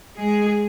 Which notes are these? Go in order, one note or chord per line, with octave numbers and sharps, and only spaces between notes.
G#3 G#4